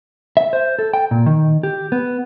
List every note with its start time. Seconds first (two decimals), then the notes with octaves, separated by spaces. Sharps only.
0.37 E5
0.53 C5
0.79 A4
0.94 G5
1.11 A#2
1.26 D#3
1.63 G4
1.92 B3